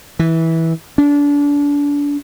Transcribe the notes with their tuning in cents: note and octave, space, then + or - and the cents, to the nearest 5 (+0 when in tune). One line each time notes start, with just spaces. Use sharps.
E3 -15
D4 -30